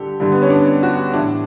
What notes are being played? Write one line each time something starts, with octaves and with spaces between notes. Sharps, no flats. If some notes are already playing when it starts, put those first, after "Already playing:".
Already playing: G2 D3 G4 A4
G2 D3
B3
C#4
D4
F#4
A2 E3 D4